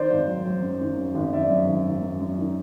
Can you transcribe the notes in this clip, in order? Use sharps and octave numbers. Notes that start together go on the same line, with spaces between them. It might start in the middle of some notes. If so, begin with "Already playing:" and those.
Already playing: D#3 C5 D5
G#1
F#3
F#3
F#2
D#3
F#2
G#1
G#1 D5 E5
F#2
G#1
G#1
F#2
F#2
D#3